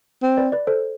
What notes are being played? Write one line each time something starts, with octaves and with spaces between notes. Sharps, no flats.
C4
B4 D5
B4 D5
A4 C5